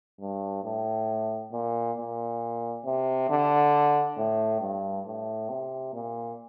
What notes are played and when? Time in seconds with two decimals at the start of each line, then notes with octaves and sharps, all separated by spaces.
0.21 G2
0.64 A2
1.52 A#2
1.98 A#2
2.85 C3
3.30 D3
4.18 A2
4.61 G2
5.06 A2
5.49 C3
5.94 A#2